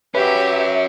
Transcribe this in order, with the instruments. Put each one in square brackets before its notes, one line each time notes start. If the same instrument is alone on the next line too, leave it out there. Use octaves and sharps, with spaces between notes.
[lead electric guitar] C#4 F#4 [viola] G4 [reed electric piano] B4 [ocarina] E5